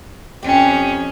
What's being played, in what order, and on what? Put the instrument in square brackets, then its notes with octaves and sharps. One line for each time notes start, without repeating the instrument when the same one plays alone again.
[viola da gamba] F2 C#4 [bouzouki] G4 G5